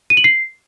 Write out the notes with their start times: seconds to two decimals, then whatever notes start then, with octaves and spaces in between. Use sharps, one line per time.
0.10 D#7
0.17 F#7
0.24 C7